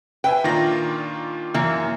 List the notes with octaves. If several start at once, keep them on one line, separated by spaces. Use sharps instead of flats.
B4 E5 G5 G#5
A#2 D#3 D4 F4 A#5 A#6
F#2 E3 A#3